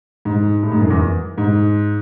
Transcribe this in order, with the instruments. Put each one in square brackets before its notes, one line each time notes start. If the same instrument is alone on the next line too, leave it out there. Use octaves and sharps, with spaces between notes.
[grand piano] G#2
A2
G#2
F#2
E2
G#2